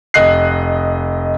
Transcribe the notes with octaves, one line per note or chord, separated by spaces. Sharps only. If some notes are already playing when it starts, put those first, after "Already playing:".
F1 D#5 F#6 C7